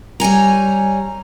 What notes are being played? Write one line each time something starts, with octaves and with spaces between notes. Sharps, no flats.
G3 C#5 G#5 A#5